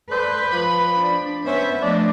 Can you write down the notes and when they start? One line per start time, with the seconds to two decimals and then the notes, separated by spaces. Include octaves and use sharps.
0.10 A4 B4 C5 D5
0.52 F3 B5
0.99 D4
1.45 B3 C#4 B4 C5 E5
1.81 F3 A3 D4 D#5